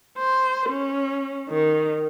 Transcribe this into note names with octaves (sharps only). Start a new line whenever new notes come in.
C5
C#4
D#3